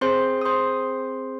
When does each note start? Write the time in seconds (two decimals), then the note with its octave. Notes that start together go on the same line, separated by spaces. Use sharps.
0.01 C4 G#4 C5 C6
0.41 D#6
0.45 C5 C6